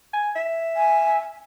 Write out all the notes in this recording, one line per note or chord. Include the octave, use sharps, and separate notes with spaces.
G#5
E5
G#5